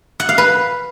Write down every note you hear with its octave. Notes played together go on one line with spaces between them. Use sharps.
F#5
F5
B4